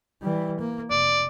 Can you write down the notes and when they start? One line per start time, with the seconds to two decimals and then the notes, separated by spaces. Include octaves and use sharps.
0.22 E3 G3
0.60 A#3
0.90 F1 D5